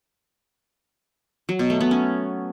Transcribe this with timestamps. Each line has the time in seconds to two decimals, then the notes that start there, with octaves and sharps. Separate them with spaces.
1.49 F#3
1.59 B2
1.70 A3
1.81 B3
1.91 C#4